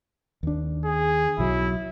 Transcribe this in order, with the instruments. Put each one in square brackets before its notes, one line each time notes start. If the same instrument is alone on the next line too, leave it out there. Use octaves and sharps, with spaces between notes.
[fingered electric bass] D#2 D4
[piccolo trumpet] G#4
[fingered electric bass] B1 F#3 [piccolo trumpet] E4